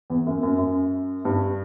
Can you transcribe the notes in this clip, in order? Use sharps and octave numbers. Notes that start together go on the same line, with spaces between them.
E2
F#2
F#2
F#2
G2